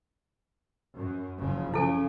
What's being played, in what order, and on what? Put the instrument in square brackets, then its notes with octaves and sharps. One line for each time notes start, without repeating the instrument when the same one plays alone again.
[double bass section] F#2
F#1 C#3 F3
[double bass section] C#3 [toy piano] E4 A4 G#5